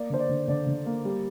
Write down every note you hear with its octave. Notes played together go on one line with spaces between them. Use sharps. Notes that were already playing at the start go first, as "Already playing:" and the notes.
Already playing: A#3 D5
D3 C5
D5
D3
D3 D5
D3
A#3
G3